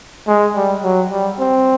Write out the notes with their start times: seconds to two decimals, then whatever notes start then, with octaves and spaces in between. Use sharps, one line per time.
0.27 G#3
0.55 G3
0.82 F#3
1.11 G3
1.39 C4